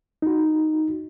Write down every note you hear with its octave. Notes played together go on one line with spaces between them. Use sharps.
D#4 F#4